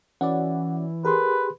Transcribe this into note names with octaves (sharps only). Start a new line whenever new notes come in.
E3 C#4 F#4 D5 F#5
G4 G#4 A#4 B4 C6